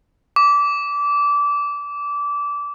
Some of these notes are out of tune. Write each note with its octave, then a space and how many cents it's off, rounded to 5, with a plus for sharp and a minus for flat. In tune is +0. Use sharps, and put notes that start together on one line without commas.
D6 -20